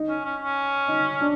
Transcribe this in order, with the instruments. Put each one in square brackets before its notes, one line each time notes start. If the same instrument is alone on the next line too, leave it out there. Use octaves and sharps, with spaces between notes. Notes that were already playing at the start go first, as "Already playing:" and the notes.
Already playing: [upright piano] D#4
[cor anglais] C#4
C#4
C#4
[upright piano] D#4
D4